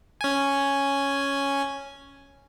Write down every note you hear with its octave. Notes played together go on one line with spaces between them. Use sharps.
C#4 G#5